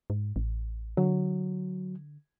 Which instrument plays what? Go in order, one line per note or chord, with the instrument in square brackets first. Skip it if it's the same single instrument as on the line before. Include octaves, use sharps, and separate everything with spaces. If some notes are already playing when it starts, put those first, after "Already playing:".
[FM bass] G#2
A1
[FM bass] D3 [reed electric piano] F#3